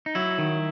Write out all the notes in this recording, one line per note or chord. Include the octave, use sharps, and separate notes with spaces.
D#4
F#3 E4
D#3